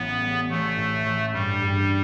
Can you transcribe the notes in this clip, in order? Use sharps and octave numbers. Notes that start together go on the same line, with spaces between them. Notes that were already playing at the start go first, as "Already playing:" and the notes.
Already playing: A1 A2 B3
G3
A1 A3
A2
A1
G2 G3
G2